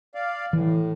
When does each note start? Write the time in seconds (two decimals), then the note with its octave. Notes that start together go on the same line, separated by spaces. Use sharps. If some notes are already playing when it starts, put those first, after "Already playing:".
0.15 D5 F5
0.53 A2 E3